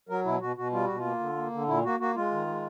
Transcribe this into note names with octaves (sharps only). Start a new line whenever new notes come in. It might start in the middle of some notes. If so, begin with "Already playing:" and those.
F#3 A#4
B2 E4
B2 F#4
B2 F#4
G3 F4
B2 F#4
F4
A#3
D3
A#3
D3
A#2 E4
A#3 F#4
A#3 F#4
G#3 F4
D#3
G#3